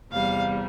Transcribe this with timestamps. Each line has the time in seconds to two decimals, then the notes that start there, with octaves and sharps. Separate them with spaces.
0.11 E2 C3 G3 F5